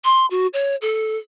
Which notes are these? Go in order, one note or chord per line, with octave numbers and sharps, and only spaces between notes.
C6
F#4
C#5
A4